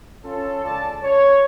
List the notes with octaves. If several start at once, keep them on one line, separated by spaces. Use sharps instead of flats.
C#4 F4 A4
C#2 C#4 D5 A5
C#5